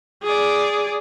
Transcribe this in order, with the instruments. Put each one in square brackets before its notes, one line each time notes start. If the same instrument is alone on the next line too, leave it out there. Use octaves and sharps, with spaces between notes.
[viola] G#4 D5